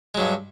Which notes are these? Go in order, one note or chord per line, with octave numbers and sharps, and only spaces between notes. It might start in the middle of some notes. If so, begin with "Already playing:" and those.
G2 F#3 G#3